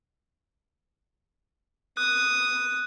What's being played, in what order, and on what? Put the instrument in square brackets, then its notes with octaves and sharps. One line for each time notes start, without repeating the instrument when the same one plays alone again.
[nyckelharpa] D#6 [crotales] F#6